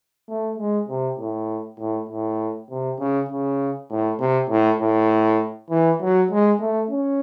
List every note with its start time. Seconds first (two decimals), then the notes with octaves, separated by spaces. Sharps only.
0.29 A3
0.59 G#3
0.89 C3
1.19 A2
1.80 A2
2.10 A2
2.70 C3
2.99 C#3
3.29 C#3
3.90 A2
4.19 C3
4.50 A2
4.80 A2
5.70 E3
6.01 F#3
6.31 G#3
6.60 A3
6.90 C#4